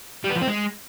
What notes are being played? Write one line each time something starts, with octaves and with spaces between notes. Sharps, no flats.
G3
B3
F3
C4
G#3